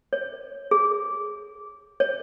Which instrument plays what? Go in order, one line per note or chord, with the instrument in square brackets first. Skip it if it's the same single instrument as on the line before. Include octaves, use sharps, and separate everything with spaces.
[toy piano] C#5
G#4
C#5